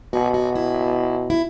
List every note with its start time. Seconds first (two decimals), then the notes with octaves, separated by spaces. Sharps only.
0.13 B2 F#4
0.34 F#4
0.55 E4
1.30 E4